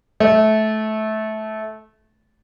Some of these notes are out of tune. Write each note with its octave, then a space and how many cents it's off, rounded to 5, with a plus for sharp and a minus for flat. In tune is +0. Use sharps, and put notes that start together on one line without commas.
A3 -20